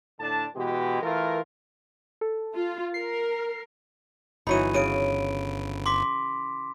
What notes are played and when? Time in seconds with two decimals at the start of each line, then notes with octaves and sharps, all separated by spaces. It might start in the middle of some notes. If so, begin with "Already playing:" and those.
0.20 A2 D3 D4 A5
0.56 B2 E3 G#3 F#4 G4
1.02 E3 A3 F4 A#4
2.21 A4
2.53 F4
2.94 A#4 C7
4.47 G1 E3 F#3 D#4 B5 D#7
4.74 C#3 D7 D#7
5.86 C6 D6 B6